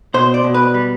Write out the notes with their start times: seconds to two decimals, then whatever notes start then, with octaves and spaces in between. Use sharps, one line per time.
0.14 B2 C5
0.34 D5
0.44 B2
0.54 B4
0.74 G3